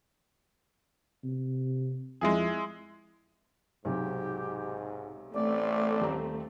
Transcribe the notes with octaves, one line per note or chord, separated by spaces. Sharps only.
C3
F2 G#3 E4 G#4
B1 G#2 C3 F#3 G4
A1 A3 C4 D5
D#1 A#5